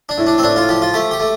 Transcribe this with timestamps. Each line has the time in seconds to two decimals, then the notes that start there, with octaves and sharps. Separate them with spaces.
0.09 D4
0.18 A2
0.27 D4
0.38 C4
0.43 A2 D4
0.56 F4
0.69 F3 G4
0.82 F4
0.94 A3 G4
1.11 G4
1.20 A3